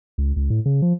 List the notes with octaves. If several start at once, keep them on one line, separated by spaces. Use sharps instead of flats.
C#2
C#2
A2
C#3
F3